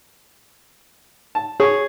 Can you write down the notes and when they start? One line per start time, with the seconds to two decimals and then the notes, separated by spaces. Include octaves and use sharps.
1.35 A5
1.60 G#4 C#5